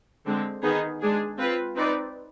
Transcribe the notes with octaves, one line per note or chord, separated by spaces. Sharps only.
D3 G#3 C4
D#3 B3 D#4 G#4
G#3 D4 G#4
C4 F4 B4
C4 D#4 B4 D5